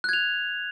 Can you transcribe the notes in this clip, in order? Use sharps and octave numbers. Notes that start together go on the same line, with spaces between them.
F#6 G#6 F7